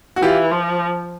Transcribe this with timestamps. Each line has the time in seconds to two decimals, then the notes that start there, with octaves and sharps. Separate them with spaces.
0.16 F#4
0.22 E3 F4 G4
0.51 F3